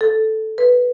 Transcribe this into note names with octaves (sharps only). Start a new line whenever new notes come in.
A4
B4